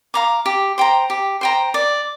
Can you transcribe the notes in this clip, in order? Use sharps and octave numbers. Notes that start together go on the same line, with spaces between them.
F5 A#5 D6
G4
C5 G5 A#5
G4
C5 G5 A#5
D5